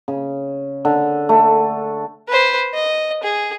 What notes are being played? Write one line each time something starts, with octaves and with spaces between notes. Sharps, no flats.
C#3
D3
A3
B4 C5
D#5
G#4